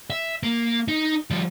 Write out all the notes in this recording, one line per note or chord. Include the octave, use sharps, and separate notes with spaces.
E5
A#3
D#4
F3 G3